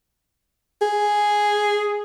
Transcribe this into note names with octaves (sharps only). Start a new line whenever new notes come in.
G#4